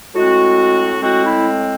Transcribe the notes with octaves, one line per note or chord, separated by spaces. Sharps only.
A2 G#3 C4 F#4
A2 G#3 C4 F#4
E4